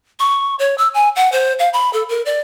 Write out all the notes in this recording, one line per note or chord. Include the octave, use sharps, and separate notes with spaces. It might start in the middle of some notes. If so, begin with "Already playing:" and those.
C#6
C#5
E6
G#5
F#5
C5
F5
B5
A4
A#4
D5